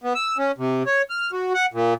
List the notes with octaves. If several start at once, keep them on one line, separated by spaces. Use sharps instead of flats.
B3
E6
C#4
C3
C#5
F6
F#4
F#5
A#2